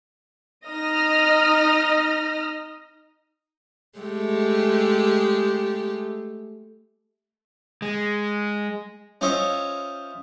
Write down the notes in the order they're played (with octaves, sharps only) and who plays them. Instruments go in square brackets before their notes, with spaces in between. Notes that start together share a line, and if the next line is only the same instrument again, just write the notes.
[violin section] D#4 D#5 D#6 F6 A#6
[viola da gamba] G#3 A3 G4
[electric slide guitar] G#3
[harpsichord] C#4 F4 C5 C#5 D#5 E5